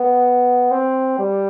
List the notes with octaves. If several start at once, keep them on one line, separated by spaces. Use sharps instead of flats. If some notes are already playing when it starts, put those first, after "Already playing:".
Already playing: B3
C4
G3